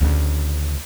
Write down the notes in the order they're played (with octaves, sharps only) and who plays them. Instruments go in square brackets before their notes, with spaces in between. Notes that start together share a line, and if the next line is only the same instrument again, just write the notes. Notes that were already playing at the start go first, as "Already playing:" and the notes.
[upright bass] D2 C#3